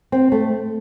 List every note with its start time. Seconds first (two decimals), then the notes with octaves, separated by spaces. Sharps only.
0.12 C4
0.32 A3